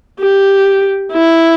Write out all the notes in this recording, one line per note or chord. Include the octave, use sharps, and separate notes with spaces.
G4
E4